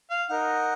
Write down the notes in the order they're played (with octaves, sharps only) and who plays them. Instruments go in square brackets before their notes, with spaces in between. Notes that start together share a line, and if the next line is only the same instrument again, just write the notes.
[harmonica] F5
[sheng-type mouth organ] D#4 A#4 D#5 [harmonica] F#5